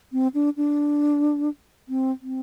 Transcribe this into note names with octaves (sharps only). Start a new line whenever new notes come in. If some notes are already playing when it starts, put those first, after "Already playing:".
C4
D4
D4
C4
C4